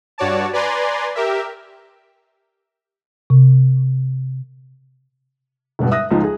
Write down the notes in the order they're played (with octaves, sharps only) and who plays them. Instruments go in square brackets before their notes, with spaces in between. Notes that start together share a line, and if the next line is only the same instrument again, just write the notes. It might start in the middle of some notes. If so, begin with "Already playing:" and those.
[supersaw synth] G2 F#4 C#5 D5 A5
B4 D5 G#5 A#5 C6
G4 A#4 E5
[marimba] C3
[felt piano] E1 G2 B2
E5 D#6 F#6 A#6
C#2 F3 D#4
G#4